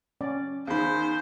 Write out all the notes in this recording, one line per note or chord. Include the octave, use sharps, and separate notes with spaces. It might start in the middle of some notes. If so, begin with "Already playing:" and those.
C#4 D5
E2 D#3 C5 F5 B5